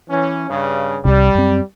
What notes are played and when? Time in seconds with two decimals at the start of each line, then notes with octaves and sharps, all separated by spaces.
0.10 E3 C#4
0.50 G2 C#3
1.05 C2 C3 G3
1.35 F#2 C4